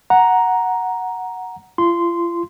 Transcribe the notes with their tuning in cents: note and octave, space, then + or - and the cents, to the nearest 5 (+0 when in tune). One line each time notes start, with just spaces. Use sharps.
F#5 +0 A#5 +5
F4 -40 C6 -10